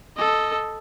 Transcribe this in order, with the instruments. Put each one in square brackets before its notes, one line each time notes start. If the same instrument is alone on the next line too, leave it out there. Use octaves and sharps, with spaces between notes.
[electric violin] A4 D#5